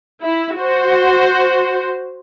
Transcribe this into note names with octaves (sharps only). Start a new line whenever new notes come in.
E4
F#4 C5